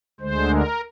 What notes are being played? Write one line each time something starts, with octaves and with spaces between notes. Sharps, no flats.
D2 D3 G#3 C5
A#4